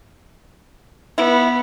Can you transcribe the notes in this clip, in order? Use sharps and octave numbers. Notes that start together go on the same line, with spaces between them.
B3 E4